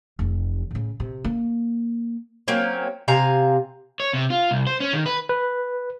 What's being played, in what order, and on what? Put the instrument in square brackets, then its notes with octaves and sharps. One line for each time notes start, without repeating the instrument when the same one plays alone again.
[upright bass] F1 E3
A2 C#3
C3
A#3
[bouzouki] F#3 A#3 C4 C#4
C3 F5 G#5 A#5
[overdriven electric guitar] C#5
C3
F4
C2
C5
C#4
D#3
B4
[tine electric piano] B4